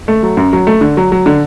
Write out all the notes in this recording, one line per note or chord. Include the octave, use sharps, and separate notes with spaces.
A3
F#3
F#2
F#3
A3
D3
F#3
F#3
D3